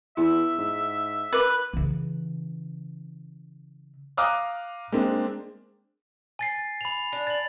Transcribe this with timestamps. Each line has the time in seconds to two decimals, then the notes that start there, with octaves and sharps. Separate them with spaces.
0.17 E2 E4 E5
0.58 G#2
1.33 A#4 B4 D6
1.73 C#3 E3
4.17 F5 A#5 D6 D#6 F6 F#6
4.92 G#3 A#3 C4 D4
6.39 G#5 A6 C7
6.81 B5 F7
7.12 D4
7.27 A6 F#7